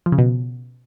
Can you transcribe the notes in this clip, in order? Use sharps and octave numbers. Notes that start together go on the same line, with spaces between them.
F3
C#3
B2